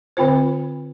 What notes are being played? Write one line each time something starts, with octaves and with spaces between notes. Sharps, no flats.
D3 C4 F4 C5